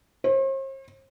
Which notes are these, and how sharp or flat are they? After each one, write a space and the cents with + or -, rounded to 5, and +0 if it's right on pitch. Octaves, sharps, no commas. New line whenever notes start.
C5 +45